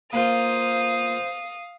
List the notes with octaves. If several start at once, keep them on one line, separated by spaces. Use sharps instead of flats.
A#3 F4 C5 F5 D#6